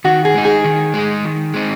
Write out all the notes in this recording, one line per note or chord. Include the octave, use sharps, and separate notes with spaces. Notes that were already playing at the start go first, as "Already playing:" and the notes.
D#3 F#4
G#4
G#3 D#4
G#4
D#3
G#3 D#4
D#3
G#3 C4 D#4